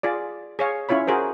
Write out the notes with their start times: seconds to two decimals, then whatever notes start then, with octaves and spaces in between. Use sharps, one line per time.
0.03 F4 G#4 D5
0.59 G#4 C#5 F5
0.89 C#4 E4 F4 C#5 B5
1.07 F#4 G#4 A#4 C5